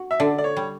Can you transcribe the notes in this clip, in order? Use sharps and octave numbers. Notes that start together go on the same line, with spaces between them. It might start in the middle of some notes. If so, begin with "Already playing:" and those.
Already playing: F#4
E5
D3 D5
D5
C#5
G3